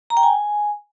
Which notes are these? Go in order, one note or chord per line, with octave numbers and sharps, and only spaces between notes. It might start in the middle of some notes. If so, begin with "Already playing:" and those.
A#5
G5
G#5